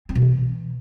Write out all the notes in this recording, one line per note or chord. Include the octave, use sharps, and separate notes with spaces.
C4
B2
E3